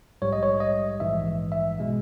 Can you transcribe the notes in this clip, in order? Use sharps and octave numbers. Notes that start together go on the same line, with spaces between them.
A#1 G#2 G3 C#5
D#5
C#5
D#5
A#1 G#2 E3 E5
E5
B2 G#3